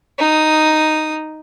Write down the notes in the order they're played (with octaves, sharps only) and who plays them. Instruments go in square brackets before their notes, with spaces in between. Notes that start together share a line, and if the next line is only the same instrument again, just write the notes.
[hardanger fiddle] D#4 D#6